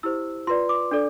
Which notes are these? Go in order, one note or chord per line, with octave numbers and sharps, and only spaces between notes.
E4 G4 C5 E6
F4 B4 D5 C6
D6
D4 A4 D5